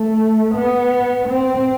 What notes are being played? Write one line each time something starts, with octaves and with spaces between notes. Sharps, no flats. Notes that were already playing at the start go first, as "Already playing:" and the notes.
Already playing: A3
B3
C4